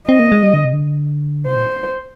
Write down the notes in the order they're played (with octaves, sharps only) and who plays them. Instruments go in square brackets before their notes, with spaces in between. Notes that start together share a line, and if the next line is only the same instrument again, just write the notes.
[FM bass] C4 [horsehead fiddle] D#5
[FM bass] A#3
G#3
G3
D3
C3
D3
[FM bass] C3 [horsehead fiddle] C5
[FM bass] A#2